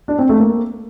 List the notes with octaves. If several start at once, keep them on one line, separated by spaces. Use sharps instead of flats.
D4
C4
A3
A#3